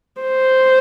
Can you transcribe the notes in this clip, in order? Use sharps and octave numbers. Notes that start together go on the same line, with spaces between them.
C5